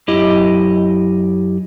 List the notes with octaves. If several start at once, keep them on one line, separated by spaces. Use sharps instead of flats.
F#2 E4 G4 D#5